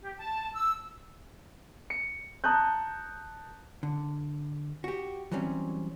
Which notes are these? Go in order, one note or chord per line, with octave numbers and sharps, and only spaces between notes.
G4
A5
E6
C#7
A5 A#5 D#6 F#6 G6
D3
F#4 G4
E3 F#3 G3 C4 C#4